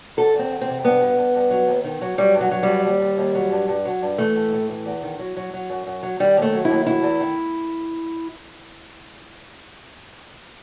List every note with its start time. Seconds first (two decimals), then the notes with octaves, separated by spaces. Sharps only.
0.17 E2 A4
0.34 E2
0.39 C4
0.50 E2
0.61 C4
0.68 C3
0.84 G2 B3
1.01 G2
1.18 G2
1.35 G2
1.50 F#3
1.68 D#2
1.84 D#3
2.01 F#3
2.18 F#3 G3
2.34 G2
2.41 F#3
2.51 F#3
2.63 G2 G3
2.85 D#2
3.01 D#2
3.18 D#2
3.35 F#3
3.52 G2
3.68 G2
3.85 F#3
4.02 G2
4.18 E3 A3
4.36 A2
4.52 A2
4.69 E3
4.86 E2
5.03 D#3
5.19 F#3
5.37 F#3
5.53 F#3
5.70 F#2
5.86 F#2
6.03 F#3
6.20 D#3 G3
6.37 D#2 A3
6.53 F#3
6.65 E4
6.70 D#2
6.86 F#3 E4
7.03 E2
7.20 D#3